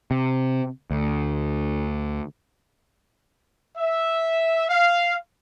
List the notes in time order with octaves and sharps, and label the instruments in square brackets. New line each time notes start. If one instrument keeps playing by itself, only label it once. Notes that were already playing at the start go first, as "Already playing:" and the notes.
[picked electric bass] C3
D2
[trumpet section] E5
F5